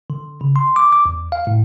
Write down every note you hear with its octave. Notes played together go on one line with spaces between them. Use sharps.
D3
C#3
C6
D6
D6
E2
F5
A2